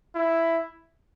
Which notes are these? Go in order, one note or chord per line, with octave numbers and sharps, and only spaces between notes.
E4